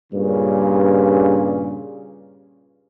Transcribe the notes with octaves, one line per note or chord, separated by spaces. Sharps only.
G2 A#2 C#3